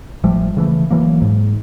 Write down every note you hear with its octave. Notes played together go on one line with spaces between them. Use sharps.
A1 F3 G3 A3
C#3 E3 G#3 A3
E3 F#3 A#3
G#2